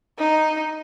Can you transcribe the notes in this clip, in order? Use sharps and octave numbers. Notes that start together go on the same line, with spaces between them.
D#4